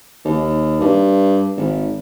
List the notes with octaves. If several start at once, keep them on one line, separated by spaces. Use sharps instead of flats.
D#2
G2
G#1